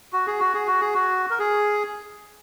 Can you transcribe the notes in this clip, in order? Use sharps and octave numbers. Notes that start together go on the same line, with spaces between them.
F#4
G#4
F#4
G#4
F#4
G#4
F#4
A#4
G#4